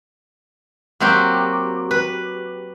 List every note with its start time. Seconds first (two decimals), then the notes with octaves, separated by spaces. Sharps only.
1.00 F#3 A#3 C4 F#4 G4
1.91 B4